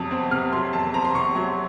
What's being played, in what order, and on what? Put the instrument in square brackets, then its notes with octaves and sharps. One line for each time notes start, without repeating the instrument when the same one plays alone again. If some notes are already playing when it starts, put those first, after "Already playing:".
Already playing: [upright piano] F2 C3 F#3 D#6
C4
C3 F6
F#3 C6
F2 A5
C4 A#5
C6
C3 C#6
F#3